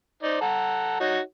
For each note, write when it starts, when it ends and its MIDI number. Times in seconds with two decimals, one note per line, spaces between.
0.23 0.41 63
0.23 0.41 72
0.23 0.41 74
0.41 0.97 69
0.41 0.97 78
0.41 0.97 82
1.00 1.20 63
1.00 1.20 66
1.00 1.20 73